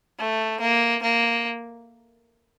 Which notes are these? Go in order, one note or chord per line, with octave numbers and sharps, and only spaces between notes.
A3
A#3
A#3